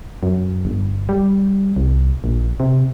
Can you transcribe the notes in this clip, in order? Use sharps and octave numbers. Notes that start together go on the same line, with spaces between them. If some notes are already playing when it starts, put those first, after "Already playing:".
F#2
G1
G3
C2
A#1
C3